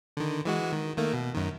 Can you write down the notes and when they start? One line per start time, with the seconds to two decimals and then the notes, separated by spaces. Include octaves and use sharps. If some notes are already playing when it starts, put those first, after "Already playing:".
0.17 D3 D#3
0.45 E3 G#3 F#4
0.72 D#3
0.97 D#3 A3 A#3
1.13 B2
1.34 F#2 D#3